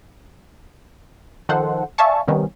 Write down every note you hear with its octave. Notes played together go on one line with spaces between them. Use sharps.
D#3 F3 A4 C5 F#5
D5 E5 F5 G#5 A5 C#6
C3 D#3 G3 B3 C#4